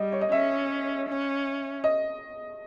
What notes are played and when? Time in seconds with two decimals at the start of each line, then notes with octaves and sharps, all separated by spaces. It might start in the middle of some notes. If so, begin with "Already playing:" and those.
Already playing: G3 D#5
0.12 C#5
0.21 D#5
0.31 C#4 E5
1.08 C#4
1.84 D#5